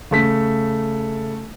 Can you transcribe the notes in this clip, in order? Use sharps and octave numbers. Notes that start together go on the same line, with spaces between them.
C#3 A3 B6